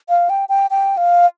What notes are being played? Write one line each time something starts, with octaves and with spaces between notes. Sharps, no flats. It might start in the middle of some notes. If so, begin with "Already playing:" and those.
F5
G5
G5
G5
F5